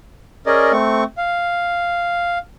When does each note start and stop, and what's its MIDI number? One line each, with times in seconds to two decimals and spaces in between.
0.46 0.72 61
0.46 0.72 68
0.46 0.72 70
0.46 0.72 74
0.46 0.72 75
0.72 1.04 57
0.72 1.04 60
0.72 1.04 85
1.18 2.38 77